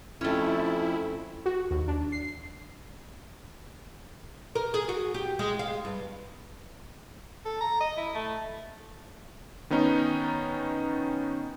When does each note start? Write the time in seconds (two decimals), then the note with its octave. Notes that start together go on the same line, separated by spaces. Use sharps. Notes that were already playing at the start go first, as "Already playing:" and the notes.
0.21 F2 A3 C#4 E4
1.46 F#4
1.71 D#2
1.88 D4
2.12 C7
4.55 A#4
4.74 G#4
4.89 F#4
5.14 G4
5.39 G#3
5.59 F5
5.85 G2
7.45 A4
7.61 A#5
7.80 D#5
7.97 E4
8.15 A3
9.70 D#3 B3 C#4 D#4